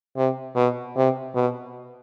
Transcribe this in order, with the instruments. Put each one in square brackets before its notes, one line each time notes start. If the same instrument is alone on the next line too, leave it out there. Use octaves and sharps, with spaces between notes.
[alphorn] C3
B2
C3
B2